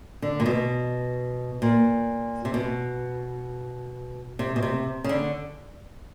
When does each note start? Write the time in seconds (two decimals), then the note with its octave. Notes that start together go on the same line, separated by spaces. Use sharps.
0.22 D3
0.40 A#2
0.46 B2
1.62 A#2
2.45 C3
2.54 B2
4.39 C3
4.56 B2
4.63 C3
5.04 C#3
5.09 D3